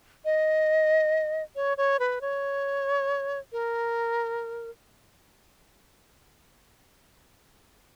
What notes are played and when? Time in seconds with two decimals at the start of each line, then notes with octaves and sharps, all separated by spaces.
0.25 D#5
1.56 C#5
1.77 C#5
2.00 B4
2.21 C#5
3.52 A#4